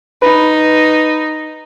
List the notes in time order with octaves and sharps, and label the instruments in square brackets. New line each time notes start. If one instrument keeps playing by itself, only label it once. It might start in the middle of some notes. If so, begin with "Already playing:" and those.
[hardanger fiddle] D#4 [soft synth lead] B4